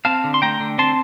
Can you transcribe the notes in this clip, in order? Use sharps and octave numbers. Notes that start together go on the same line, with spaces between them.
C4 F5 A5
D3
C6
A3 G5 A#5
D3
C4 A5 C6